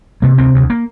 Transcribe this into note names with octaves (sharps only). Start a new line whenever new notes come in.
C3 A#3
D2 C4
D2
A#3